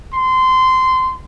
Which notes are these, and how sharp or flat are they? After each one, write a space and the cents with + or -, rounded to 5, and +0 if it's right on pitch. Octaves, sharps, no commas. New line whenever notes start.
C6 -20